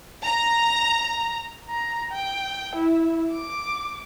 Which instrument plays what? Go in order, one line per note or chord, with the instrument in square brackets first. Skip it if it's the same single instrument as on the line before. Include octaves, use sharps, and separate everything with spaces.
[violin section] A#5
[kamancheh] A#5
G5
E4
D6